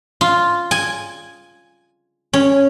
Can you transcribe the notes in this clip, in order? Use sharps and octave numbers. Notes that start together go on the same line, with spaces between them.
F4
G#5
C#4